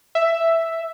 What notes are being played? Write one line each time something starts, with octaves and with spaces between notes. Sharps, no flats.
E5